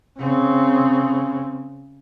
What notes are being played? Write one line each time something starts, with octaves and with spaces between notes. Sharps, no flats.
C#3 C4